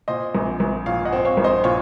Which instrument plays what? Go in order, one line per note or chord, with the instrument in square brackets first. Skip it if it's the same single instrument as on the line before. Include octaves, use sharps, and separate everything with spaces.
[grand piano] A#2 [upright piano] C5 D#5
[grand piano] A#1
A#1
[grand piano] A#2 [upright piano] C#5 F5
[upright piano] D#5 F#5
[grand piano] C4
[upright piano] C#5 F5
[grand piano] A#1
[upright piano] C5 D#5
[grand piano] A#2 [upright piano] C#5 F5